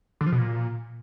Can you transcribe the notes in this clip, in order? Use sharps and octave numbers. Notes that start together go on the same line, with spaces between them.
D3
F3
B2
A#2